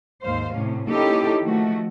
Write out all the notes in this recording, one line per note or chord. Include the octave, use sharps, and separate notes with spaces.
D#2 G#2 C5 F5
A2 C3 C#4
A#3 C#4 D#4 E4 G4 A4
D#3 F3 A3 F#4